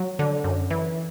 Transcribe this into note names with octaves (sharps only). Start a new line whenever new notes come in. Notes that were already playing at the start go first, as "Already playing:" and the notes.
Already playing: F#3
D3
F#2
E3